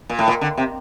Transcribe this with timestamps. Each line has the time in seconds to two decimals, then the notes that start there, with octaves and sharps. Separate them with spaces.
0.09 A#2
0.19 A2
0.28 A#2
0.41 D3
0.57 C3